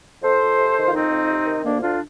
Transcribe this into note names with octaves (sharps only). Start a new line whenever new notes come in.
F2 A4 C5
F2
C3
D#3
F4
F2 C4 D#4
F2
C3
D#3
D2 A#3 D4
D3 D4 F4